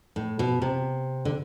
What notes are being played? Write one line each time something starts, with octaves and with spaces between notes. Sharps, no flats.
A2
B2
C3
D3